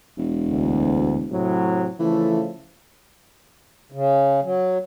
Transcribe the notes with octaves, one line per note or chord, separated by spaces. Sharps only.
E1
D2
A2 C3 F#3
C#3 E3 F3 A3
C#3
F#3